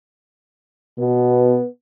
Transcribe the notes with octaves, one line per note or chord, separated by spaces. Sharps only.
B2 B3